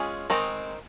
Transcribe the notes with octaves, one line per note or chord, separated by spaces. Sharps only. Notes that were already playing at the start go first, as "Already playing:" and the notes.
Already playing: G#3 C#4 F4 G#4
D#3 G#3 C4 D#4